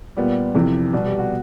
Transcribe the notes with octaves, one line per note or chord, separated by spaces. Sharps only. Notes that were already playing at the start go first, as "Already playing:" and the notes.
A#2 G3 B3 G4
F2 C3 E3
B2 G3 B3
G4
F#4